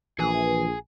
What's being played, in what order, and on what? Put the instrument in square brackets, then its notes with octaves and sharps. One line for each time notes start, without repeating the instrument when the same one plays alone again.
[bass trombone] A#1 [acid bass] E3 [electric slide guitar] G#4 G#5